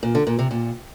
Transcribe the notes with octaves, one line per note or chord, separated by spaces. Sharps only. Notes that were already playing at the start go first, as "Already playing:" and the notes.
A#2
D3
A#2
C3
A#2